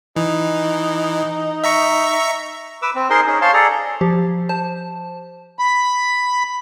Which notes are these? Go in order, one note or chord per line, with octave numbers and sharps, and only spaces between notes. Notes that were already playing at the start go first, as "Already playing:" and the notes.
E3 D#4
E5 A#5 C#6
B4 D6 E6
C4
D#4 G#4 A#4 C5 D#5 C6
C#4 D#4 G#4
C5 C#5 F5 A5 C6
G#4 A4 D5 A#5
F3 G4
C5 A5
B5